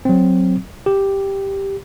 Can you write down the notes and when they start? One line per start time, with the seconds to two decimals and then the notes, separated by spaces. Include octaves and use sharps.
0.05 F#3 C4
0.86 G4